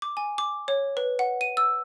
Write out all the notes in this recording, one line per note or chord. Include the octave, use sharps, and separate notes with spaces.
D6
G#5
D6
C#5
B4
F#5
D#7
E6